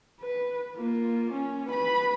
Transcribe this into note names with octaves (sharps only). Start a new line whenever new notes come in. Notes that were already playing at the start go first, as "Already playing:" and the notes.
B4
A#3 F4
C#4
B4 B5